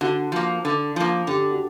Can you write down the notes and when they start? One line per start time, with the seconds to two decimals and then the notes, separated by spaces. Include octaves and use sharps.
0.01 D3 F#4
0.32 F3 A#3
0.65 D3
0.96 F3 A#3
1.27 D3 G4
1.51 F#4